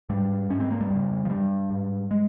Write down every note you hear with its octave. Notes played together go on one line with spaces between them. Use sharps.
G#2 G3
G#2 C#4
C4
A#3
G3
F2 C#3
F3
G2 G3
G#2
G#3